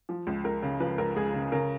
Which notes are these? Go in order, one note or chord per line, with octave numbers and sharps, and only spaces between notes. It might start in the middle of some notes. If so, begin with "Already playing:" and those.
F3
C#2
C#2 A#4
C#3
F3 B4
C#2 A#4
C#2 G#4
C#3
C#3 A#4